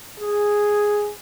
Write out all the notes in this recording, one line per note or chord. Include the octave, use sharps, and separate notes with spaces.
G#4